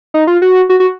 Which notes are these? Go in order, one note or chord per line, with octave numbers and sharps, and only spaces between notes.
D#4
F4
F#4
F#4
F#4